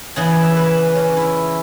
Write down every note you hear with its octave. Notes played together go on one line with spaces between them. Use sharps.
C#3 E3 B3 G#4
E5
B4
C#4
E4